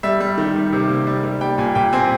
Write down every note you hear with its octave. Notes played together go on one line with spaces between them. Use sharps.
G3 E5
G3
D#3
G3
C3
A#3
G3
G3
G3 G5
A#2 G#5
A#2 G5
C4 G#5